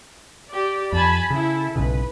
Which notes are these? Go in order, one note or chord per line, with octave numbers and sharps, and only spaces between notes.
G4 D5
F2 G#5 A5 B5
C#3 E4 A4
B1 G#2 C#3 B4